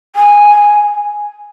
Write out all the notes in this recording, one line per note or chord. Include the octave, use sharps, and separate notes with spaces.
G#5